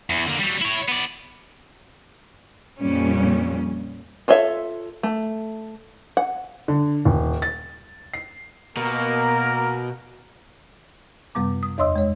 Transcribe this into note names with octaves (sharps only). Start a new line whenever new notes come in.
E2
D3 A#3
F#3 G3
E4 C#5
B3 D5
F2 A#2 G3 C#4
F4 A4 C#5 D#5 E5
A3
F#5
D3
D#1
A6
C7
B2 A#3 A#4
F#2 C3 G3 B3 D6
D#6
E2 C#5 D#5 C6 D#6 E6
G#3 C#5